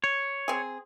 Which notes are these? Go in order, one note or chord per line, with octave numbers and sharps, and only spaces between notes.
C#5
C4 G#4